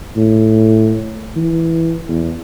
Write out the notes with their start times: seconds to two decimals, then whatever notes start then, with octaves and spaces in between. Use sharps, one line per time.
0.16 A2
1.36 E3
2.08 E2